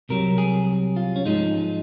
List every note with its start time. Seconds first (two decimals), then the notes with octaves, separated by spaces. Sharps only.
0.09 C2 C3 F#3 A#4
0.38 G#4
0.96 F4
1.16 C#4
1.25 G#2 F3 G#3 D#4